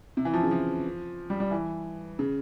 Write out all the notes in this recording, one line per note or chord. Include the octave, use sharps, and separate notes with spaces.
C3
E3
F3
C#3
F3
G3
G3
E3
C#3